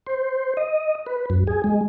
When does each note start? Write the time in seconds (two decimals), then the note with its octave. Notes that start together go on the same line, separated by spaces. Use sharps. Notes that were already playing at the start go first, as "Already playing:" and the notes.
0.07 C5
0.57 D#5
1.06 B4
1.30 F#2
1.47 G#4
1.64 G#3